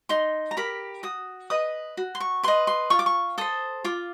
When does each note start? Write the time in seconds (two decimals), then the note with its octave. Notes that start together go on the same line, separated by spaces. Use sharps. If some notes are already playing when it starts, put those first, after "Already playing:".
0.09 D#4 C6
0.51 A#5
0.57 G4 A#4 B5
1.03 F#4 D#6
1.50 B4 D#5 D#6
1.97 F#4
2.15 C6
2.20 C#6
2.43 B4 D#5 C6
2.67 C6
2.90 F4 C#6
2.99 D6
3.06 C#6
3.38 A4 C5 D#6
3.85 F4 D6